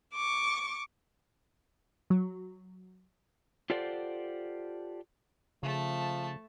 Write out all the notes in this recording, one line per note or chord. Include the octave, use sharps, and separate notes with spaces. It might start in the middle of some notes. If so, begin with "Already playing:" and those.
C#6 D6
F#3
F4 G4 A4 C5 D5 F#5
C#3 F3 A3 A5